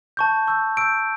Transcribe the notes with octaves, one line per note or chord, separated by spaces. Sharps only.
A5 C#6 G6
C#6 E6 G6
C#6 E6 G6 D7